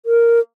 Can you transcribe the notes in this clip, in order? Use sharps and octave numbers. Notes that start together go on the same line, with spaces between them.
A#4